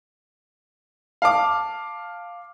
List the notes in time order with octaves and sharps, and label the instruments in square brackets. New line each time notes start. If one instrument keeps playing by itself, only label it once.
[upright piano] F5 A5 D6